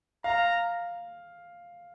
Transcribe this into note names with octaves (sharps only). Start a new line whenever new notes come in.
F5 A#5